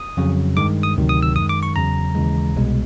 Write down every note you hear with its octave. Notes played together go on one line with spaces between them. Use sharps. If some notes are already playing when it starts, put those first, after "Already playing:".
Already playing: D#6
F2 C#3 F#3
G2 D#3 G#3 D6
D#6
D2 C3 D#3 F#3
D#6
E6
F#2 D#3 G#3 D#6
D6
C#6
E2 C#3 F#3 A#5
D#2 C#3 E3 G#3
C2 B2 G#3